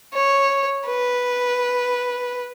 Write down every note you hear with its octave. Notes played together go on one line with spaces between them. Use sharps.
C#5
B4